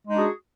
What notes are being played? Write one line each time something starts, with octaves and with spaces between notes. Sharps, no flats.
G#3 D4 D#4 F#4 G#4